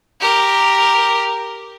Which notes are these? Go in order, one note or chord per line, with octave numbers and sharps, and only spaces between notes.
G4 A#4